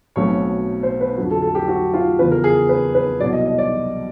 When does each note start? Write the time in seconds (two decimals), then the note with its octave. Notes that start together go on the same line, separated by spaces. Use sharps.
0.16 B1 B2 F#3 A3 C4 C#5
0.83 C5
1.01 B4
1.18 F2 D3 F#3
1.31 A4
1.42 A4
1.55 G4
1.68 F#4
1.94 F4
2.19 E2 C#3 F3 B4
2.31 A#4
2.44 G#4
2.69 B4
2.95 B4
3.20 C2 B2 F#3 D5
3.33 D#5
3.46 D#5
3.58 D5